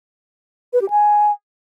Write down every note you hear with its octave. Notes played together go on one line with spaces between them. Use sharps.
B4
G4
G#5